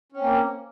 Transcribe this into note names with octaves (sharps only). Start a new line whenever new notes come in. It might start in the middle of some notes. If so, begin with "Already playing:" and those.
A#3 C4 C#4